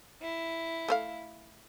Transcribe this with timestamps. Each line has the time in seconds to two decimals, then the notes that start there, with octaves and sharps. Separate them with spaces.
0.20 E4
0.88 A3 C5 F5